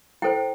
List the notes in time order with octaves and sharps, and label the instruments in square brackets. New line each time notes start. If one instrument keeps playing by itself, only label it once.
[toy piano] E4 A4 C5 G5